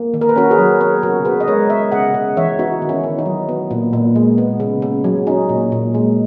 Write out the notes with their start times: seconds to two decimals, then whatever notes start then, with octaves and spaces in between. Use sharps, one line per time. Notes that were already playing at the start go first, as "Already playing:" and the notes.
Already playing: A#3
0.14 D#3
0.21 A#4
0.29 B4
0.36 C#4 F#4 A#4
0.51 G#4 B4
0.59 F#3
0.80 B3 A#4 C#5
1.03 C#3 F#4 A#4
1.25 C#3 G#4 B4
1.40 D#5
1.48 G#3 A#4 C#5
1.70 B3 C#5 E5
1.92 C#3 D#5 F#5
2.14 C#3
2.37 E3 C#5 E5
2.59 B3 D#4 F#4
2.82 D#3
2.89 C#4 E4
3.04 D#3
3.19 D#4
3.26 F#3
3.49 B3
3.71 A#2
3.93 A#2
4.16 G#3
4.38 B3
4.60 C#3
4.82 C#3
5.04 F#3
5.27 C#4 D#4
5.49 A#2
5.72 A#2
5.94 G#3